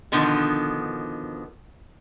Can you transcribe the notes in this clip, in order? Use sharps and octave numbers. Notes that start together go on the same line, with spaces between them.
B2 D3 D#3 F3 B3